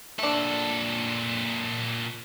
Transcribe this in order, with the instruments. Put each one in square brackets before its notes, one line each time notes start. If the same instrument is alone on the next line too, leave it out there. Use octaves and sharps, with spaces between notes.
[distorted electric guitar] A#2 A4 [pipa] A3 D4